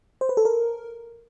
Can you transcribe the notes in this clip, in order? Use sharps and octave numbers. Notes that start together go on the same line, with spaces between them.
C5
B4
A4
A#4